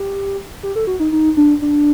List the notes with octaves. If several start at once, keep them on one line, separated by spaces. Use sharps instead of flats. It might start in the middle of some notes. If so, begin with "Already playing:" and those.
Already playing: G4
G4
A4
F#4
D#4
D#4
D4
D4